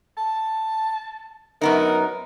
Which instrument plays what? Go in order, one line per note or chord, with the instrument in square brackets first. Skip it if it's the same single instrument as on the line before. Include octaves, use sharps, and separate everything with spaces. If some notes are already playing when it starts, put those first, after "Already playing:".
[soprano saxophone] A5
[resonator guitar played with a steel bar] F#2 B3 D#4 [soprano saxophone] A#4